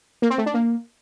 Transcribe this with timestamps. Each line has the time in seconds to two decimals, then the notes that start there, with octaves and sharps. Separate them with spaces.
0.22 A#3
0.30 C4
0.38 A3
0.46 D4
0.54 A#3